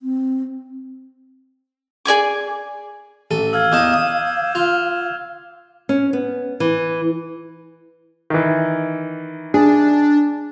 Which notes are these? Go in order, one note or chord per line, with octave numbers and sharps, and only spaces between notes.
C4
G#4 D5 G#5 D6
A1 A4 D#7
F5 E6 F6 G#6
E2 D#4 D6 D#6 G6 E7
D#6
F4 F6 F7
C#4
B3
E3
D#3 E3
D4 G#4